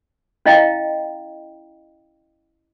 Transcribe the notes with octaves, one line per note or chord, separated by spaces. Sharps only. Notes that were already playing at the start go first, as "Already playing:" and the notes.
C#4 E4 D#5 F5 G5 A#5